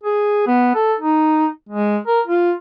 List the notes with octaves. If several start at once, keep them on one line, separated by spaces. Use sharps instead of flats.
G#4
B3
A4
D#4
G#3
A#4
F4